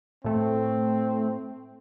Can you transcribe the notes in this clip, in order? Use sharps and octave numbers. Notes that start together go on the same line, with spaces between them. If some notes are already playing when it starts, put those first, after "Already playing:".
A2 A3 C4